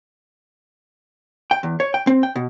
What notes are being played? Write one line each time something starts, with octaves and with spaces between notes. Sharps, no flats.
G5
E2
C#5
G5
C4
G5
B2